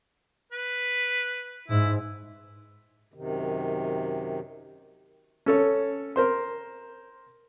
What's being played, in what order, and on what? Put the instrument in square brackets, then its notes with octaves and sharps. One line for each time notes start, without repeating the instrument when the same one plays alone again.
[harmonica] B4
[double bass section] G#2 [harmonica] E4
[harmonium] F#2 C3 D#3
[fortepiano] C#4 A4 C#5
A#4 C5 C6